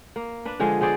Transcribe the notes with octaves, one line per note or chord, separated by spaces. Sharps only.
A#3
D4 B4
D3 F3 G#3 G#4
B3 G#4 C5 D5